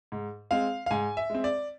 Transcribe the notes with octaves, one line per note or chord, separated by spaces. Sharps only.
G#2
G#3 C4 F5
F5
G#2 G#5
E5
G#3 C4
D5